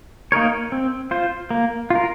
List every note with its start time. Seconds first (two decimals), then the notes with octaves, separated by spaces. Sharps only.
0.32 A#3 D#4 A#4 C#5
0.72 C4
1.11 F4 C5
1.51 A#3
1.90 F4 A#4